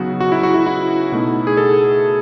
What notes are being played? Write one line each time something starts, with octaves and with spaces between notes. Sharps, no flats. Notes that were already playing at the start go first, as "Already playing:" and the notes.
Already playing: C#3 F#3 B3 D#4 F#4
F#4
E4
F#4
E4
E4
B2 A3 D#4
G#4
A4